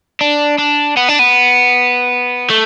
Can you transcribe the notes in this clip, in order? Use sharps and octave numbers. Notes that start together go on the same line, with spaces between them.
D4
D4
B3
D4
B3
A3